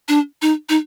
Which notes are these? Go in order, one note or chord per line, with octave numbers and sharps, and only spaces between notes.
D4
D#4
D#4